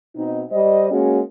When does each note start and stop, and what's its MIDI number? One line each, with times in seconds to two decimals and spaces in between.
0.16 0.42 47
0.16 0.42 60
0.16 0.42 63
0.51 0.88 55
0.51 0.88 72
0.51 0.88 75
0.90 1.21 56
0.90 1.21 58
0.90 1.21 61
0.90 1.21 66
0.90 1.21 68